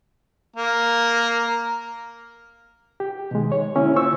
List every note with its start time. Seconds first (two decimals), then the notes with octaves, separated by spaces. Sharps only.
0.56 A#3 A#4
3.00 G4
3.31 B2 D#3 G#3
3.52 C#5
3.75 D3 A#3 C#4 E4
3.96 F4 C5 C#6 E6